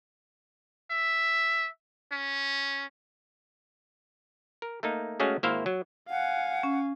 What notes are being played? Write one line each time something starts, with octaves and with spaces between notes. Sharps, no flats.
E5
C#4
A#4
A3 A#3 D#4
G#3 A3 C#4 F#4 G#4 F5
G#1 A#3 E4 C5 E5 F5
F#3
F5 F#5 G#5
C#4